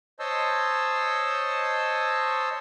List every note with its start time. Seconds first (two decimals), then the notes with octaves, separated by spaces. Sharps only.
0.20 C5 C#5 D#5 A5 C6 E6